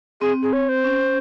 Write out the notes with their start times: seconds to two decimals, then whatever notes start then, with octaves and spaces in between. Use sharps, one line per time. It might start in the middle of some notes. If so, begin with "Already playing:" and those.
0.21 C4 G#4
0.43 G#4
0.53 C#5
0.69 C5
0.84 C#4